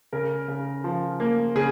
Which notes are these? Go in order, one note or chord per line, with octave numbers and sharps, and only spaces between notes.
C#3 A#4
C#3
F3
A#3
C#3 G#4